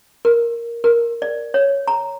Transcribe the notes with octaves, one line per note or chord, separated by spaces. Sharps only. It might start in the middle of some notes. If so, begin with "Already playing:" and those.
A#4
A#4
D5
C#5
A#5